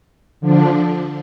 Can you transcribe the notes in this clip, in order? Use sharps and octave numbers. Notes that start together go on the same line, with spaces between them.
D3 F3 D4